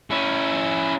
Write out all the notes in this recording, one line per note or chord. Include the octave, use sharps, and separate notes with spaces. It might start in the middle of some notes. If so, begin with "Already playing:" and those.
C#4 E4